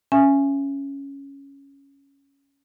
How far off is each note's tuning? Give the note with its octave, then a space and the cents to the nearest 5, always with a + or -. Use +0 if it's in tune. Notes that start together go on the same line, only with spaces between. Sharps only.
C#4 +0 E5 +25 G#5 +0